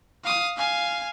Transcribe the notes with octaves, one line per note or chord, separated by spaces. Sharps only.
F5 D#6
F5 G#5